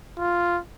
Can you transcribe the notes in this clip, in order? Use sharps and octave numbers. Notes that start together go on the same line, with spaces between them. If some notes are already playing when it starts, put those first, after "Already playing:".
F4